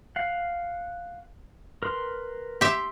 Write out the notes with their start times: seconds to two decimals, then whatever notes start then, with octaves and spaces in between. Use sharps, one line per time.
0.16 F5 F#5
1.83 A#4 B4 C6
2.61 G4 E5 C6